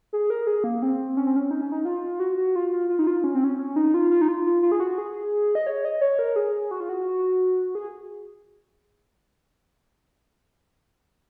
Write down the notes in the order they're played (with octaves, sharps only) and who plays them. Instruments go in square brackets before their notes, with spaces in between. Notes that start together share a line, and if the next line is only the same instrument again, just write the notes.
[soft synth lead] G#4
A#4
G#4
A#3
C4
C#4
C4
C#4
D#4
C#4
D#4
F4
F#4
F#4
F4
F4
F4
D#4
F4
C#4
C4
C#4
C#4
D#4
F4
F4
D#4
F4
F4
F4
G#4
F#4
G#4
D#5
C#5
D#5
C#5
A#4
G#4
F#4
F4
F#4
G#4